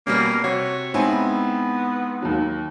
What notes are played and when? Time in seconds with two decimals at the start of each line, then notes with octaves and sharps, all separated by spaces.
0.07 B2 G3 A#3 C#4
0.44 C3 F#4 C#5
0.94 G#2 B3 C4 E4 G#5
2.22 D#2 F#3